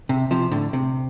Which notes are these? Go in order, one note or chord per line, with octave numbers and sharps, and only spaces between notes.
C3
C3 F3
A2 D3
C3